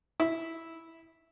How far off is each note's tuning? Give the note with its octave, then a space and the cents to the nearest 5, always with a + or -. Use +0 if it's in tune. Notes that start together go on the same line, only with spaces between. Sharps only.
E4 -5